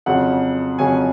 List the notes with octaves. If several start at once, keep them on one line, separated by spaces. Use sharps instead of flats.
F2 C#3 F#3 C#4 F#5
F2 C#3 F#3 C#4 G#5